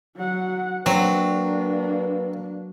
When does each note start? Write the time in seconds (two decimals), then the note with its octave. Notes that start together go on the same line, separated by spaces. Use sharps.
0.16 F#3 F#5
0.86 F#3 A#3 C4 D4 B4